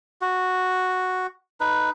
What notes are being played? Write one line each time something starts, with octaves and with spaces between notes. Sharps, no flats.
F#4
D#4 B4